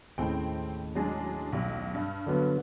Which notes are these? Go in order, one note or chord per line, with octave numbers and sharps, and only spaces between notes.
D#2 A2 C#3 C4 G5
F#3 G#3 D4
B1 G3
G2
D3 F#3 B3